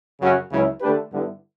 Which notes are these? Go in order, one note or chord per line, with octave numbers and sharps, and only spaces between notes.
F#2 C#3 F#3 C#4 F#4
C#2 C#3 F#3 C#4 E4
D3 A3 D4 G4 B4
G2 D3 G3 B3 E4